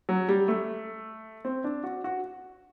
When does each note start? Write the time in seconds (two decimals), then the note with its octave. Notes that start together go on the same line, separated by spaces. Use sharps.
0.09 F#3
0.29 G3
0.48 A3
1.45 C4
1.64 D4
1.84 F#4
2.04 F#4